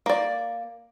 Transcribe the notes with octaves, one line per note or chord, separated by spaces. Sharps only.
A#3 D5